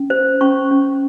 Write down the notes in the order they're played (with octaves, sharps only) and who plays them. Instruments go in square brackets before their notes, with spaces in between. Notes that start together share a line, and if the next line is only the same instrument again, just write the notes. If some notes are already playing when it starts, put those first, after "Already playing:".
Already playing: [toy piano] C#4
C5
C#4 C#6
C#4